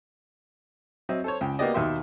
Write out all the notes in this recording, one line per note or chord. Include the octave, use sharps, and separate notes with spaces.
F#3 C4 D#5 E5
A4 C5 C#5
C#2 G5
A#3 B3 F#4 G4 D5 D#5
D#2 B2 D#4 E5 G5 C6